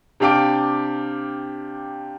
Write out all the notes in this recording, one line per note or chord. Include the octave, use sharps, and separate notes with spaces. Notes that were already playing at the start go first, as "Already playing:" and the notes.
C3 D4 G4 F5 D6 D7